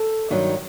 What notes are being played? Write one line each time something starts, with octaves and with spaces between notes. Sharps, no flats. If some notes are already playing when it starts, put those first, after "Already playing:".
Already playing: A4
G2 D#3 F#3